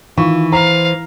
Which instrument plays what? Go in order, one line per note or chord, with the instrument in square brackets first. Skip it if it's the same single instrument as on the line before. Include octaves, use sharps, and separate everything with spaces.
[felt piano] D#3 C#6 [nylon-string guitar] E3 [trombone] F4
[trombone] C5 [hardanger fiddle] F5 [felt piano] A#5